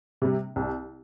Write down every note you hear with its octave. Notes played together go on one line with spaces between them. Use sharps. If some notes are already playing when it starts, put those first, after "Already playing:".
C3 G3
C2